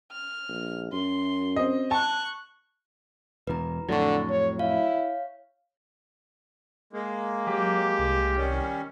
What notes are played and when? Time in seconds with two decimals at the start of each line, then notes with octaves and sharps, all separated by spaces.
0.12 F6
0.48 A#1
0.92 F#2 C6
1.56 C4 D#5
1.91 A5 C#6 F#6
3.47 E1 E2 B4 A#5
3.89 F2 A2 D3 F#3 C#6 A6
4.29 C#5
4.59 E4 C#5 F5
6.93 G#3 A#3
7.47 F#3 G4
7.99 C2
8.36 D#3 G3 C#4